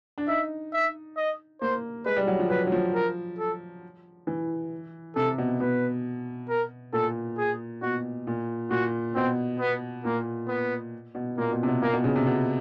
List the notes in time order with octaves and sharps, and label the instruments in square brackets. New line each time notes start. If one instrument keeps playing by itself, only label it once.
[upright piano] D4
[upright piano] D#4 [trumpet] E5
[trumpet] E5
D#5
[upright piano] A#3 [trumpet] C5
[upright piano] G#3 [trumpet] B4
[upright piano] G3
F#3
F3
[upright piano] F#3 [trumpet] B4
[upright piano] F#3
F3
[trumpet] A#4
A4
[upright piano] E3
[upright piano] C3 [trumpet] A4
[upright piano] B2
[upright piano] B2 [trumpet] B4
[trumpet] A#4
[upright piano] A#2 [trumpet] A4
[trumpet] G#4
[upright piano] B2 [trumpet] F#4
[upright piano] A#2
[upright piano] A#2 [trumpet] F#4
[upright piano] B2 [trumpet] C4
[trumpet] B3
[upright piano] A#2 [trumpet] A#3
[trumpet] B3
[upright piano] B2
[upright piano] A#2 [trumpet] A#3
[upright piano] B2
C3
B2
[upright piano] A#2 [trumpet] A#3
[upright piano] B2
C#3
C3
B2